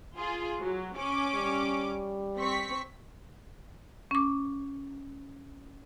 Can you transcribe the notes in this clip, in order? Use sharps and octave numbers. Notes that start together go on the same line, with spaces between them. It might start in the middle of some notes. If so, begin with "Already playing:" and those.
F4 G#4
F#3
C#4 D6
G3
C4 C#6 B6
C#4 D6